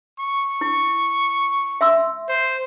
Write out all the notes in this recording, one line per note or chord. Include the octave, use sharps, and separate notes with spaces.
C#6
E4
E5 C6 E6
C5